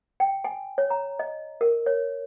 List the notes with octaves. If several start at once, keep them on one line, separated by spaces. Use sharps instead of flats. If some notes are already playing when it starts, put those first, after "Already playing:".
G5
G#5
C#5
A#5
D#5
A#4
C#5